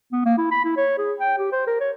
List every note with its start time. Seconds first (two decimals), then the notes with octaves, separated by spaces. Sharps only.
0.13 B3
0.26 A#3
0.38 E4
0.52 B5
0.65 E4
0.77 C#5
0.98 G#4
1.20 G5
1.38 G4
1.53 C5
1.67 A#4
1.81 C#5